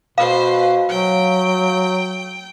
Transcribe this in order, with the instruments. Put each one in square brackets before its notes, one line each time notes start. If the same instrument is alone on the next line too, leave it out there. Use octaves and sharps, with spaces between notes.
[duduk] B2 [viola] B4 C5 [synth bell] F5
[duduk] F#3 [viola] G5